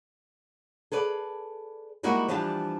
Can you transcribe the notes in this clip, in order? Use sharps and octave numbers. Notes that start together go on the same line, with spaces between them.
G#4 A4 B4 D5
G3 G#3 A#3 D#4 E4 F#4
E3 F3 G3 D4 G4 A5